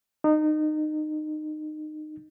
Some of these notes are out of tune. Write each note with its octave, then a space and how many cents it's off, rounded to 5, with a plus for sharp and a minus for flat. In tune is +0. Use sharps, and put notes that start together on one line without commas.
D#4 -25